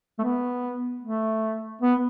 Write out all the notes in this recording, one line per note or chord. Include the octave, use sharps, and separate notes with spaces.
A3
B3
A3
B3